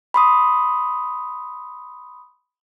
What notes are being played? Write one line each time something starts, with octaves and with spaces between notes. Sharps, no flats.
B5 C6 D#6